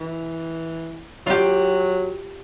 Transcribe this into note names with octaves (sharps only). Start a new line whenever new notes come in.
E3
F#3 F4 G4